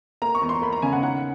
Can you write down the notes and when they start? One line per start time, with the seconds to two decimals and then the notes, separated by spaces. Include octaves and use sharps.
0.22 A#3 A#5
0.35 C#6
0.42 E2
0.49 C6
0.62 A#3 B5
0.72 A#5
0.82 C#3 G#5
0.92 F#5
1.03 D#3 F#5